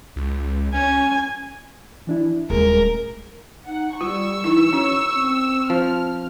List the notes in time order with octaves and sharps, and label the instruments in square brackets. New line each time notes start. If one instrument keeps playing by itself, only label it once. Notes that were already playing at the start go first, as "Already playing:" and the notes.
[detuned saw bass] C#2
[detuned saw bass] C#4 [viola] G#5
[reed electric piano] E3 D4 E4
[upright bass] D#1 [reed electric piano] G#3 A3 G#4 [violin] A#4
[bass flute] D#4 [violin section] F#5
[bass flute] G3 [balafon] F4 [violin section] C#6 E6
[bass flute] E3 [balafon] D#4 E4
[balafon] C#4 F#4 [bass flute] C#5
[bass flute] C4
[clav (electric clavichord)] F3 [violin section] F6